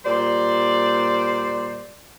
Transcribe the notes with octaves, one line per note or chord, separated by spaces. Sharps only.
A#2 G3 C5 D5